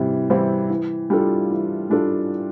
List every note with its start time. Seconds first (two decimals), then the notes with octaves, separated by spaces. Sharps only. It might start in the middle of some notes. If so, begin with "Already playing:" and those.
Already playing: C3 E3 G3
0.30 E3 G3 C4 E4
0.70 E3
1.10 G3 D4 F4 A4
1.51 E3
1.90 G3 D4 F4 A4